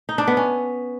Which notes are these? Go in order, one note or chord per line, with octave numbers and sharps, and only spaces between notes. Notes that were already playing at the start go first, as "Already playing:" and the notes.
D#4
D4
B3
C#4